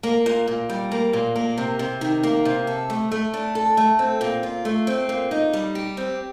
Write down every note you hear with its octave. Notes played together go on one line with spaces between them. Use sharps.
A#3
A#2
A#2
G3
A#3
A#2
A#3
C3
C3
D#3
A#3
C3
A4
A3
A3
D4
A4
A3
C4
A#2
F4
A3
C4
A#2
D#4
G3
G4
C4